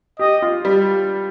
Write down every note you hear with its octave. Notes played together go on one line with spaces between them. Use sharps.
G4 D#5
F4
G3